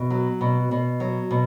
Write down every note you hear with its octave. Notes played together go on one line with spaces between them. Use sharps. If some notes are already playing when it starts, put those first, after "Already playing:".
Already playing: B2
F#3
B2
B2
F#3
B2